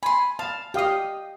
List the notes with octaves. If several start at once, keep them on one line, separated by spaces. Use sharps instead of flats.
G#5 B5 C6
F5 A5
G4 D#5 F5 G5 D#6